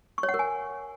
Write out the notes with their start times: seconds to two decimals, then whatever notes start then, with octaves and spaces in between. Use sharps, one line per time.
0.18 C#6
0.23 C#5
0.29 F#5
0.34 A#4
0.39 G#5